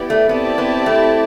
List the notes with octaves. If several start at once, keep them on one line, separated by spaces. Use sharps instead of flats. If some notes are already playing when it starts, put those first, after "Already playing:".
Already playing: B3 E4 G4 D5
A3
B3 C4 E4 G4 D5 A5
B3
A3